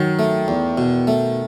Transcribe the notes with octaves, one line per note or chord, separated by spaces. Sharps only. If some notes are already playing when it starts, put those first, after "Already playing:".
Already playing: D#3 F#3
A3
E2
B2
A3